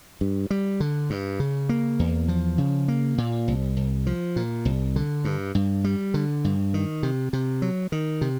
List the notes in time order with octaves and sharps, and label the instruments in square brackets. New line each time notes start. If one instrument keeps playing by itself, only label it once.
[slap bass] G2
G3
D3
G2
C#3
A#3
E2
F3
C#3
A#3
A#2
C2
C2
F3
A#2
C2
D3
G2
G2
G3
D3
G2
D#3
C3
C3
F#3
D#3
C3